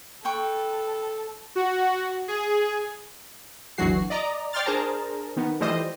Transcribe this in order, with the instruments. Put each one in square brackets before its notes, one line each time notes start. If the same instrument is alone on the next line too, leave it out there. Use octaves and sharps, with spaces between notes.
[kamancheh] A4 [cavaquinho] B4 G5 C#6
[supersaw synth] F#4
G#4
[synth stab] G1 D2 E3 F#3 F#4 C7
D5 D#5 A#5
C#5 D5 G5 C6 F6 A6
D4 G#4 A#4 C5 A5 A#5
D#3 B3
E3 F3 G3 A3 C5 D#5